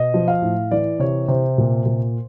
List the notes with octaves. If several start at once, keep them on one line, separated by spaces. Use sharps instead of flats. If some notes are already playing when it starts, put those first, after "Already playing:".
Already playing: B2 D#5
F3
F5
A2
E3 D5
C3 C#5
C3 C5
A#2
A#2